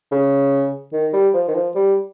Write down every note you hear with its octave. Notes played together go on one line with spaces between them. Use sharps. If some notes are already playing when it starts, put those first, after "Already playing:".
C#3
D#3
G3
F3
D#3
F3
G3